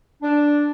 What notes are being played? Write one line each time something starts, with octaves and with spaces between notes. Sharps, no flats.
D4